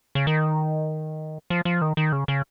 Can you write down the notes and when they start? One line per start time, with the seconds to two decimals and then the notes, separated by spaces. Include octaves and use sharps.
0.15 C#3
0.27 D#3
1.50 F3
1.65 F3
1.81 D#3
1.97 D#3
2.12 C#3
2.28 C#3